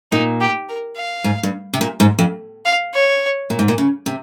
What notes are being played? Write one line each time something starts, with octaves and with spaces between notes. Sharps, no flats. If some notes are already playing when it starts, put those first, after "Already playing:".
A#2 D#4
G4
A#4
F5
G#2
G2
C3
A#2
G#2
F2
F5
C#5
A#2
G#2
A#2
C#3
C3